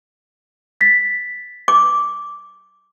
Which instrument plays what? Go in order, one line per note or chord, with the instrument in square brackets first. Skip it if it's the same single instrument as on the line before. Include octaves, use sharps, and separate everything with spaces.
[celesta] A6 B6
[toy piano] D6